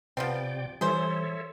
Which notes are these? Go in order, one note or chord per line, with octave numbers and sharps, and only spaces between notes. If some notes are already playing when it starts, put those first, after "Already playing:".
C3 F3 B3 C4 D5 G5
E3 G3 G#4 A4 C5 C#5 E5